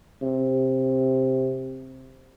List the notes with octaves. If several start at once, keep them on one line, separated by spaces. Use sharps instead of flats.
C3